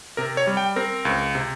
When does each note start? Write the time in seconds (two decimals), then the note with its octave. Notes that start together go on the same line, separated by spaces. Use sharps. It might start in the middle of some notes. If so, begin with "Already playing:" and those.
0.17 C3 A#4
0.37 C#5
0.47 G3
0.57 G5
0.76 C4 A#4
1.05 C#2
1.35 C3